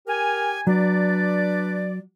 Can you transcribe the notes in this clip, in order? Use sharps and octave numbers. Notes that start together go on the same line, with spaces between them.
G4 A#4 G#5
F#3 D4 B4 D5